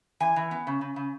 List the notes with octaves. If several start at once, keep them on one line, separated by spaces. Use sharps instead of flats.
E3 G#5
E3
B3
C#3
C#3
C#3